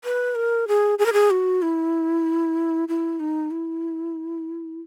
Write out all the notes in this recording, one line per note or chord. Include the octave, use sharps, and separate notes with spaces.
B4
A#4
G#4
G#4
A#4
G#4
F#4
E4
E4
D#4
E4